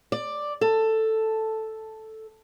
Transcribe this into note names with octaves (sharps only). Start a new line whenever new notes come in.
D5
A4